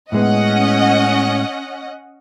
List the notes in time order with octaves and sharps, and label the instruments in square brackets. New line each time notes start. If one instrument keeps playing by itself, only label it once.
[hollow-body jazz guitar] A2 G#3 B3 [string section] C#4 D#5 F#5